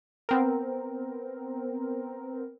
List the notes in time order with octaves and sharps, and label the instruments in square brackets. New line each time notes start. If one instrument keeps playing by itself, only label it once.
[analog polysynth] B3 C4 A#4